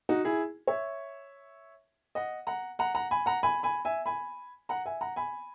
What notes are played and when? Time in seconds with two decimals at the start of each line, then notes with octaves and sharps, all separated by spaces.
0.09 D#4 F#4
0.25 E4 G#4
0.67 C#5 E5
2.15 D#5 F#5
2.47 F#5 A#5
2.79 F#5 A#5
2.95 F#5 A#5
3.11 G#5 B5
3.26 F#5 A#5
3.43 G#5 B5
3.63 G#5 B5
3.85 E5 G#5
4.06 G#5 B5
4.69 F#5 A#5
4.86 E5 G#5
5.01 F#5 A#5
5.16 G#5 B5